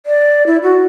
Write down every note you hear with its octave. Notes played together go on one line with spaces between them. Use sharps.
D5
E4
F#4